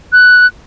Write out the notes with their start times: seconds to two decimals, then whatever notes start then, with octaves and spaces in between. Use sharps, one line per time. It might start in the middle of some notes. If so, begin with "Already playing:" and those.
0.12 F#6